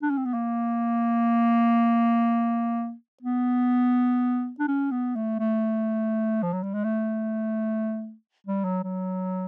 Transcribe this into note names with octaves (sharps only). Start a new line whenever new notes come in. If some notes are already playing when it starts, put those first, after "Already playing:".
D4
C#4
C4
B3
A#3
B3
D4
C#4
B3
A3
A3
F3
F#3
G3
G#3
A3
G3
F#3
F#3